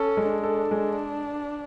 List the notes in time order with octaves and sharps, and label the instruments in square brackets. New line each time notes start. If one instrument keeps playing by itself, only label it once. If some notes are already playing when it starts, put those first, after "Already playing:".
Already playing: [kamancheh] C#4 [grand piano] A4
[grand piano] G#3
[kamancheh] D4
[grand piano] A4
G#3